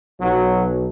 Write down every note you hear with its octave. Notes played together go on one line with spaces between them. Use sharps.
B1 F#3